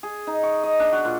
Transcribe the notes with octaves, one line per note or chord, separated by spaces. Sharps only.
G#4
D#4
C#6
D#5
D4
F#4
A#2